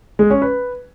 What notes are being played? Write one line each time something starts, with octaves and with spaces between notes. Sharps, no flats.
G#3
C#4
B4